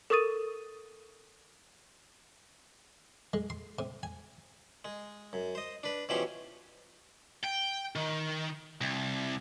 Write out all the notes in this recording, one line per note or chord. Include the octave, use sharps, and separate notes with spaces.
A4 A#4 C#6 D#6 A6 D#7
G#3
C6
C3
G#5
G#3
F#2
C5 D#5
D4 B4
B2 E3 F3 C#4 G4 C6
G5
D#3
C2